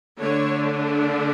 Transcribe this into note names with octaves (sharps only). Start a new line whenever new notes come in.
D3 A3 D4 C#5